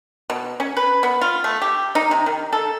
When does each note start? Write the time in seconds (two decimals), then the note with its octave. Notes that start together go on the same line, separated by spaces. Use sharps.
0.30 B2
0.60 C#4
0.77 B4
1.03 B3
1.21 F4
1.44 A3
1.62 G4
1.95 D#4
2.11 C3
2.26 D#3
2.53 A4